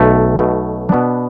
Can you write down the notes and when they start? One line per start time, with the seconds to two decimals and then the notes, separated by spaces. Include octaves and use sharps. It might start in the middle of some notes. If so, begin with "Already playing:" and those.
Already playing: B1 B2 A3
0.39 B1 B2 A3
0.89 B2 B3 D4